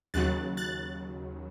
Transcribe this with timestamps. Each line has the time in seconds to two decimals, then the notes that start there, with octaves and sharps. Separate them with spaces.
0.14 D#2 C#3 F#3 F#6 A6
0.57 F#6 A6